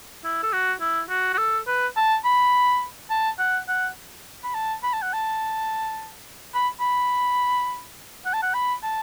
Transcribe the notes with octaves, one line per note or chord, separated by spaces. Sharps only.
E4
A4
F#4
E4
F#4
F#4
A4
B4
A5
B5
A5
F#5
F#5
B5
A5
B5
A5
F#5
A5
B5
B5
F#5
A5
F#5
B5
A5